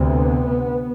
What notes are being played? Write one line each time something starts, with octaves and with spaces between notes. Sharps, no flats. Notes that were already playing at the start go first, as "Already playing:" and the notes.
Already playing: D2 C3 B3